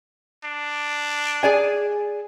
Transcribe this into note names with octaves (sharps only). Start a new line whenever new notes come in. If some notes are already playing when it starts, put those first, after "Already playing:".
D4
G#4 D5 G#5